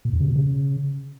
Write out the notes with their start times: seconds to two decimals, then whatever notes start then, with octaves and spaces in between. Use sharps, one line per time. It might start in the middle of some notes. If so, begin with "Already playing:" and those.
0.05 A#2
0.13 E2
0.20 C#3
0.28 B2
0.36 C#3